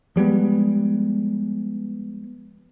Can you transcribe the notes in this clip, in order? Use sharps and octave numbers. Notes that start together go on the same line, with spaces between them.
F3 G3 G#3 B3